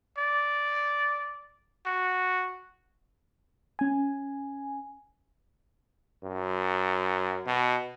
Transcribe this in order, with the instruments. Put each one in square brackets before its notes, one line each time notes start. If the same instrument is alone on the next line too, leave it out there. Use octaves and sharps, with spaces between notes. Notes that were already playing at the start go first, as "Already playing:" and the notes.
[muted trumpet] D5
F#4
[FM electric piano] C#4 G#5
[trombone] F#2
B2